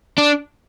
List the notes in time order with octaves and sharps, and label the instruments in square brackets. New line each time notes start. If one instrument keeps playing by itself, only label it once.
[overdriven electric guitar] D4